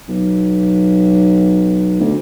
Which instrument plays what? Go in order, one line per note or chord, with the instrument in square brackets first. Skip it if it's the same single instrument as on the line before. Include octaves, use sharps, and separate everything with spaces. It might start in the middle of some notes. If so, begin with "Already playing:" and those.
[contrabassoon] B1
D2